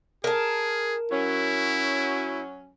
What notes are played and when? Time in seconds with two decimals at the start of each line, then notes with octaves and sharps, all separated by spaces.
0.24 G#4 A#4 A5
1.12 F#3 C#4 E4